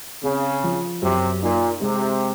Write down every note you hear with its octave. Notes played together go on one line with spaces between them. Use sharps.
C#3 C4
F3
F#2 C3
A#2 D#4
C3 G#3